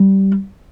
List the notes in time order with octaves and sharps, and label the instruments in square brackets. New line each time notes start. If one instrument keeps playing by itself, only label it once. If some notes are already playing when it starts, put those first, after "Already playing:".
Already playing: [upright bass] G3